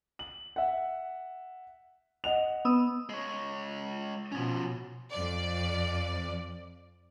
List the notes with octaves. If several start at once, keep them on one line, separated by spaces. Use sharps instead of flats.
F#7
E5 F#5
D#5 F#5 F7
B3 D#6 E6
G#3 C#5
B2 F3 C#4
F2 D5